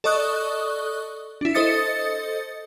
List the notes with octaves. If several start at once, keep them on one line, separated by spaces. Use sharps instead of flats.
A4 D5 D#5 C#6 D#6 F#6
D4 E4
A4 C5 D#5 D#6 A6 C#7